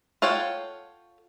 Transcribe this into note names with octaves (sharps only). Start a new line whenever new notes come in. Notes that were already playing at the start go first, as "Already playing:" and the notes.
F4 A4 C#5 F#5 G5